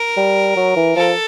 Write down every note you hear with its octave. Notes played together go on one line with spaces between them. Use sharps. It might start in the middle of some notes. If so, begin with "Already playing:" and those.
Already playing: A#4
G3
F#3
E3
F3 A4